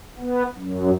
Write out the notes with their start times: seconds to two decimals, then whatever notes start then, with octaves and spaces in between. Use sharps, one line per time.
0.19 B3
0.59 F#2